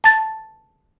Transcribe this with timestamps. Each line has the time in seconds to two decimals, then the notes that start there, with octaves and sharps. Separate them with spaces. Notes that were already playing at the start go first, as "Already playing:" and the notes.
0.04 A5 A6